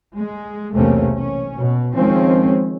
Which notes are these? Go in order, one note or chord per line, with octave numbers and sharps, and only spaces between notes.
G#3
B1 E2 C3 A3 A#3 C#4
C#4
B2
D#3 F3 G#3 C4 C#4